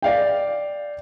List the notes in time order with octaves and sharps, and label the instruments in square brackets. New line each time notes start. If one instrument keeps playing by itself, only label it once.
[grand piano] D5 F5 G5